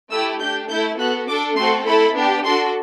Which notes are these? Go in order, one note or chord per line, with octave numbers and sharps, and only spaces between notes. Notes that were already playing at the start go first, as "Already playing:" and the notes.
A3 E4 G4 E6
D4 G4 G6
A3 E4 A4 G6
B3 F#4 A4 F#6
D4 A4 D6
A3 C4 F#4 A4 C6
A3 E4 A4 B5
B3 D4 G4
D4 F#4 A4 C6